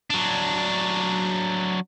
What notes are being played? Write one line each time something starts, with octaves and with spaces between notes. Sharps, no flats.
F#3 D4